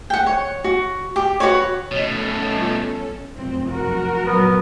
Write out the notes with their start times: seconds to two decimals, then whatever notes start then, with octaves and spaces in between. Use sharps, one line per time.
0.10 F#5 G5
0.26 C#5
0.64 F#4
1.16 G4
1.40 F#4 B4 C#5
1.91 B2 A3 C#4 A4 C#5 D#5
2.56 G3 B3 F4
3.36 F1 F#2 C4
3.69 F#4 A#4
4.26 F#2 A#2 F#3 B3